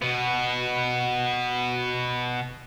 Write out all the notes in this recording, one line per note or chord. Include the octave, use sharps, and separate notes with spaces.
B2 B3